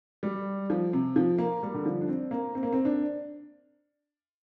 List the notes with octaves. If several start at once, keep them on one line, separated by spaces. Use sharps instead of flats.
G3
F3
C3
F3
A#3
G3
D3
F3
D4
C4
A#3
C4
A#3
C4
D4